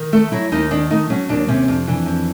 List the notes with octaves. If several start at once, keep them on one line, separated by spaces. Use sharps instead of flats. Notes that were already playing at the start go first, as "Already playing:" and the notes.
Already playing: D#3
A3 A4
F#3 E4
D#2 D#4
D#3 D4
A3 D#4
F#3 C#4
D#2 D4
C3 C#4
F2 D4
E3 D4
F2